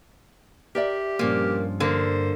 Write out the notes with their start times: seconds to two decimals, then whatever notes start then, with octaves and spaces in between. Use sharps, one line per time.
0.75 G4 A#4 D5 E5
1.19 G2 A#2 F3 A#3 C#4
1.80 D3 A#3 C5